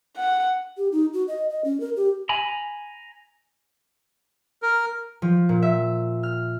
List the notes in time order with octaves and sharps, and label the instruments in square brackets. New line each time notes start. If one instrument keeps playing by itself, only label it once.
[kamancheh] F#5
[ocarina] G4
D#4
F#4
D#5
D#5
C#4
A#4
G4
[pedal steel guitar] G#5 A#5 B5
[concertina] A#4
[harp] F3
A#2
E5
F6